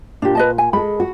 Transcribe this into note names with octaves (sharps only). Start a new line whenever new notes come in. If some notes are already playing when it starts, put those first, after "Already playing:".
A#2 D4 G4
B4 D#5 A5
G#5
G#3 A4 B5
F#4